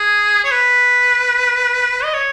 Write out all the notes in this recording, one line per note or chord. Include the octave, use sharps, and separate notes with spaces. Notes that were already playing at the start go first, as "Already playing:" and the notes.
Already playing: G#4
C#5
B4
D#5
C#5